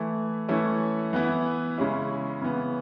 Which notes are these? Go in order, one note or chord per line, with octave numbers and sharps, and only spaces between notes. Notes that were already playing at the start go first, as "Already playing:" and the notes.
Already playing: E3 A3 E4
E3 A3 C#4 E4
E3 B3 E4
C#3 G#3 C#4 E4
C#3 E3 B3